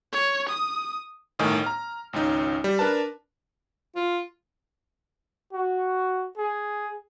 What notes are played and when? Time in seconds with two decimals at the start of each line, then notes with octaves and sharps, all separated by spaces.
0.13 C#5
0.49 D#6
1.39 G1 A2 D#3 D#4 G#5
1.64 A#5 F6
2.13 G#1 C#2 C#4 D#4
2.64 G3
2.79 D4 A#4 B4 A5
3.96 F4
5.53 F#4
6.38 G#4